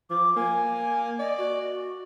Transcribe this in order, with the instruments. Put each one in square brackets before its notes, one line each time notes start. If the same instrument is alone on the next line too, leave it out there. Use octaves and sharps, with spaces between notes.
[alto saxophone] F3 [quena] D6
[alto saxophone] A#3 [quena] G#5
[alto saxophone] D5 [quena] D#5
[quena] F#4